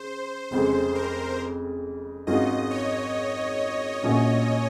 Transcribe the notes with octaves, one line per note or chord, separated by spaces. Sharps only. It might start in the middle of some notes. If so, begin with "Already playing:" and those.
Already playing: C#3 C5
F1 F2 C#3 G#3 C5
A#4
G#1 G#2 F#3 C#4 F4 D#5
C#5
A#1 A#2 F#3 C#4